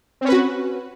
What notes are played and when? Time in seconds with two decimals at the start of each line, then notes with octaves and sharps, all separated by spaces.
0.21 C4
0.25 C#4
0.29 B4
0.32 F#4